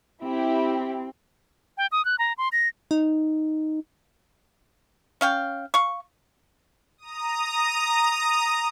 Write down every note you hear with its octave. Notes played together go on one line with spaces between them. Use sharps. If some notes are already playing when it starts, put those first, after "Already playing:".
C4 E4 G4
G5
D#6
F#6
A#5
C6
A#6
D#4
C#4 F5 G5
F5 C#6
A#5 D#6